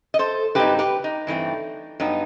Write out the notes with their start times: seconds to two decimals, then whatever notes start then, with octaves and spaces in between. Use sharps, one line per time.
0.14 D#5
0.19 A4 C5
0.55 G2 F#3 C4 D#4 G4 B4
0.79 G4 B4
1.04 D#4
1.27 G2 E3 A3 C4
2.00 G2 F#3 B3 D#4